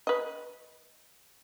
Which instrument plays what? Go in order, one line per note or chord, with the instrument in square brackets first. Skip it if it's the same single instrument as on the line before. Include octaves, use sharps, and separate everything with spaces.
[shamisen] B4 D#5